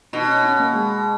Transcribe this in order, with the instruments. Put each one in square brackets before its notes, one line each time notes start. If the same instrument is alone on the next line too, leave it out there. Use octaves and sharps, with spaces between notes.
[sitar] B2 [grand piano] D#4
[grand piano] C#4
C#4
A#3
G#3